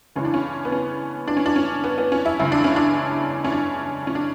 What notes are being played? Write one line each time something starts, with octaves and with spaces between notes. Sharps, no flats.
C#2 C#3 E3 C#4
D4
C#4
B3
C#4
D4
C#4
D4
C#4
B3
B3
C#4
E4
C#2 C#3 E3 E4
D4
C#4
D4
C#4
D4
C#4
D4